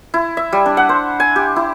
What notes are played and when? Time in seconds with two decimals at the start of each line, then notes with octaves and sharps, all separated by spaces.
0.14 E4
0.37 E5
0.53 G3
0.66 D4
0.77 F#5
0.89 C5
1.20 G#5
1.36 G4
1.56 E4